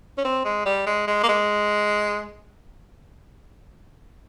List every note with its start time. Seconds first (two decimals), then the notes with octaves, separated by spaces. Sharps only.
0.18 C#4
0.24 C4
0.45 G#3
0.66 G3
0.87 G#3
1.07 G#3
1.23 A#3
1.28 G#3